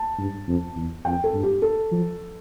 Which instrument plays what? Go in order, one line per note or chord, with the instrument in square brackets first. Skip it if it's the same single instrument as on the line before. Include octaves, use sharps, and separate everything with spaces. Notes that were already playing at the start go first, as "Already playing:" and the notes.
Already playing: [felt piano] A5
[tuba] G2
F2
E2
[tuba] F2 [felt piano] G5
[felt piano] A4
[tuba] G2
[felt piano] G4
A4
[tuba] F3